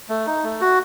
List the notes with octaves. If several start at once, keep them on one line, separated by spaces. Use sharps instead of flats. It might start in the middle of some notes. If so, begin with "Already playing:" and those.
A3
D#4
A3
F#4